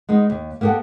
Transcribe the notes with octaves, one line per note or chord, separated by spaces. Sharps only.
G#3 B3 D#4
D#2
A#3 B3 G4 A4 F#5